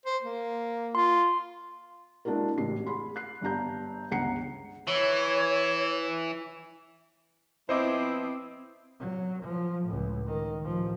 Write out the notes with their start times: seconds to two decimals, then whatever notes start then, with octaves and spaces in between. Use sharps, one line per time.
0.06 C5
0.22 A#3
0.95 F4 C6
2.25 G#3 A#3 D4 E4 F#4 A#4
2.58 A1 C#3 C7
2.86 G#4 B5 C6
3.16 F#6 C7
3.41 G1 G2 D4 A#5 G6
4.11 G1 C#2 F#5 A#5 C7 C#7
4.87 E3 C#5
7.69 F3 B3 C4 E4 C5 D#5 D6
9.00 F#3
9.43 F3
9.86 C#2 A2
10.26 D#3
10.61 A1 F3